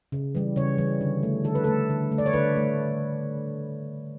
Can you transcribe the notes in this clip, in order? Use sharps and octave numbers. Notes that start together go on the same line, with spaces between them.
C#3
E3 G3
C#3 C#5
E3 G3
D3
A3
D3 A4
B4
A3 A4
D3
A3
D5
C#5
D3 B4
A3